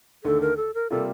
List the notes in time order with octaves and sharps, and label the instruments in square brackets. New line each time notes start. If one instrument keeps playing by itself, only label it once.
[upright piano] D#2 D3 A3 [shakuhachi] A4
[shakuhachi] A#4
A4
A#4
[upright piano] C3 G3 A#3 F4 [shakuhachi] A4